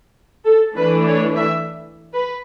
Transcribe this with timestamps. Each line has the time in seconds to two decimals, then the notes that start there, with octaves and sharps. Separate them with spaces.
0.45 A4
0.76 E3 A3 D4 B4
1.06 C#5
1.37 E5
2.14 B4